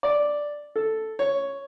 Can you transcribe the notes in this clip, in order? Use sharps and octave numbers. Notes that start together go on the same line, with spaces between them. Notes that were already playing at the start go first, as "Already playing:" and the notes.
D5
A4
C#5